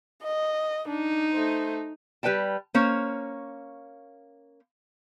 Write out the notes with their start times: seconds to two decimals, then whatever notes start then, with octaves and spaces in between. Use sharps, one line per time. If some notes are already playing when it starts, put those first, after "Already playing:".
0.23 D#5
0.88 D4 D#4
1.32 A3 C5
2.23 G3 B4 D#5 G5 A5
2.74 A#3 C#4 C5 C#5